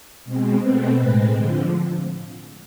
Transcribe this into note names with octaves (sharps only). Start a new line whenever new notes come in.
B2 G#3 C4
B2 A3 C4 B4
A2 G#3 C4 B4
D3 F3 C5